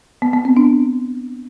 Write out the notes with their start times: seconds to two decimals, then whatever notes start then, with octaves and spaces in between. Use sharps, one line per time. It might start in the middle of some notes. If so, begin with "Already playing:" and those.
0.22 B3
0.34 B3
0.45 C4
0.57 D4